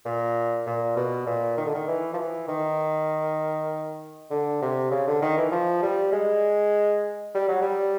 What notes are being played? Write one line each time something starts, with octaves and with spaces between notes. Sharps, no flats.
A#2
A#2
B2
A#2
D#3
D3
D#3
E3
F3
E3
D#3
D3
C3
C#3
D3
D#3
E3
F3
G3
G#3
G3
F#3
G3